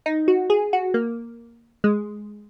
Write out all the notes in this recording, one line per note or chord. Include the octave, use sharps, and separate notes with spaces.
D#4
F#4
G#4
F#4
A#3
G#3